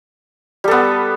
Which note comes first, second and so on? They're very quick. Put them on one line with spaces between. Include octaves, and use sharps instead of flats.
G3 A4 B3